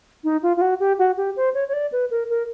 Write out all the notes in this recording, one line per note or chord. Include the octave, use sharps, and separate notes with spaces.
D#4
F4
F4
F#4
G4
F#4
G4
C5
C#5
C#5
D5
B4
A#4
A#4